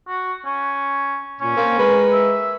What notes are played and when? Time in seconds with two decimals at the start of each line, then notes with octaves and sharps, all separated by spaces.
0.08 F#4
0.45 C#4
1.41 A#2 C#4
1.56 A#3 C4
1.79 G#3 A#4 B4
2.13 E5